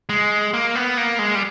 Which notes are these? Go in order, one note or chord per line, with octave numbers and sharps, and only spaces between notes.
G#3
A#3
B3
A#3
G#3
G3